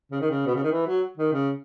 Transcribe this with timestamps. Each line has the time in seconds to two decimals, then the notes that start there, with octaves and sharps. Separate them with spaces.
0.12 C#3
0.21 D#3
0.30 C#3
0.47 B2
0.55 C#3
0.64 D#3
0.72 E3
0.87 F#3
1.18 D#3
1.33 C#3